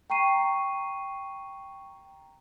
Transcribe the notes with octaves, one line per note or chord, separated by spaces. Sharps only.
G5 A#5 C#6 C7 D#7